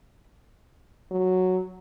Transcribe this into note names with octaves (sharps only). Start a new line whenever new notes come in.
F#3